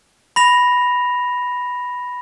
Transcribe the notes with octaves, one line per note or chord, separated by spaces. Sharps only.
B5 A#6 F7